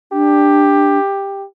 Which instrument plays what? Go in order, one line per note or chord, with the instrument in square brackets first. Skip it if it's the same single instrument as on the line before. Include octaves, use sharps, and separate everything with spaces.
[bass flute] D4 [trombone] G4